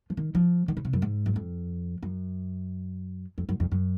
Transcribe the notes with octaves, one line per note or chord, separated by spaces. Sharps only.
F3
D#3
F3
D#3
C#3
C3
F#2
G#2
F#2
F2
F#2
F2
F#2
F2
F#2